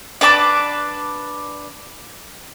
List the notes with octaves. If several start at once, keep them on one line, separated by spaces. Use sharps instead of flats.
D4 B4 A5 D6